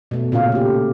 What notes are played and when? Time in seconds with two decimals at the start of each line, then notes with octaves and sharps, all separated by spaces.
0.11 B2 A3
0.32 A#2 C#3 C#4 F4 F5
0.52 A3 G4